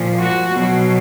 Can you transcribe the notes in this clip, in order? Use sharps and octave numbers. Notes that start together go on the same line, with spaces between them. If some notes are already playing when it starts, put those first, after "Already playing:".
Already playing: A#2 F3
F#4
B2 F#3